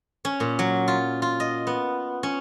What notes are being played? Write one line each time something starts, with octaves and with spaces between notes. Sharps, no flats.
C#4
A#2
F#3
F4
F4
D#5
B3
C#4